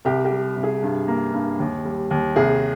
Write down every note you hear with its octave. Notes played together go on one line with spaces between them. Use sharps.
C2 G4
G4
G3
C2
G#4
G2
A#3
G2
D#2
G3
D#2
C2 G#4